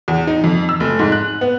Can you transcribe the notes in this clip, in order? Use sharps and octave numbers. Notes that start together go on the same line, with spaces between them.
E2
D#4
F2
E6
F1
G#2
F#6
B3